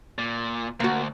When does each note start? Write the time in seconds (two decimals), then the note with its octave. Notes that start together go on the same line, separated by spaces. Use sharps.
0.18 A#2
0.80 D2 A#3 F#4